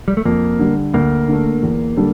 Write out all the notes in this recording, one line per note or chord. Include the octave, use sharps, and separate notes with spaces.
G3
A3
F2 A#3
D3 G3
D2 A#3
D3 A3
E2
D3 G3 D4 A4